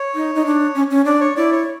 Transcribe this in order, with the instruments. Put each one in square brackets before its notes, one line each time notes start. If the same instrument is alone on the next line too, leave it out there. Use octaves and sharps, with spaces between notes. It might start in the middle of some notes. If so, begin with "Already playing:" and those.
Already playing: [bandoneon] C#5
[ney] D#4
D#4
D4
C#4
C#4
[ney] D4 [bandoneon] D5
[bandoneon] C#5
[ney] E4 [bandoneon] D5
[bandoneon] C#5